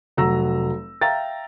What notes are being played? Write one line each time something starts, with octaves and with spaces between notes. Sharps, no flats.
F1 F#3 A#5 E6 A#6
E5 F5 G5 A#5 A6